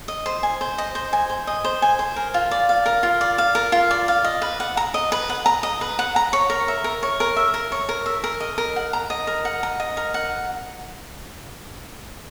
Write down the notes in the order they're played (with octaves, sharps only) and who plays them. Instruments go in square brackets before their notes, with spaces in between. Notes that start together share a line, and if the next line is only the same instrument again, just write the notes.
[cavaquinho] D#5
C5
G#5
C5
D#5
C5
G#5
C5
D#5
C5
G#5
C5
A#4
F4
D5
F5
A#4
F4
D5
F5
A#4
F4
D5
F5
D#5
B4
F#5
A#5
D#5
B4
F#5
A#5
D#5
B4
F#5
A#5
C#5
A#4
E5
A#4
C#5
A#4
E5
A#4
C#5
A#4
E5
A#4
D#5
A#4
F#5
A#5
D#5
A#4
F#5
A#5
D#5
A#4
F#5